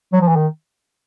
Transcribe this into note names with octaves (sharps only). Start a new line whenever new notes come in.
F#3
F3
E3
D#3